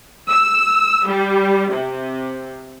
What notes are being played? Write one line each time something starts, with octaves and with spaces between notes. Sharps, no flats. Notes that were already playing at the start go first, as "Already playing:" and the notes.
E6
G3
C3